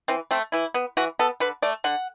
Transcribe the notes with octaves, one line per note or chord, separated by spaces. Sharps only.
E3 C4
A3 C4
E3 E4
B3
E3 F#4
B3 A4
D3 B4
A3 D5
D3 F#5